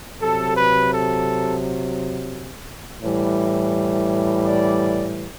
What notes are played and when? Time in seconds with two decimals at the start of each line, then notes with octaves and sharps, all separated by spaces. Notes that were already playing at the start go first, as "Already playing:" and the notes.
0.20 C3 F#3 A4
0.56 B4
0.91 A4
3.02 A2 E3 G3
4.43 D5